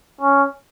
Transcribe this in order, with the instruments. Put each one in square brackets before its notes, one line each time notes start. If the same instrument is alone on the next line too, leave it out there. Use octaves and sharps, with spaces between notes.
[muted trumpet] C#4